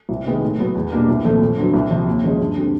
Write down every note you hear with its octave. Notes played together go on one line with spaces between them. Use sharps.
C2
C3 D#3 G#3 B3
A2
F#3 B3
E2
B2 G3 A#3 D4
C2
A#2 F3 A3 C4
F2
D3 F#3 B3
C2
C3 F3
D#2
C#3 F3 G#3 C#4
G2
D3 G3 C4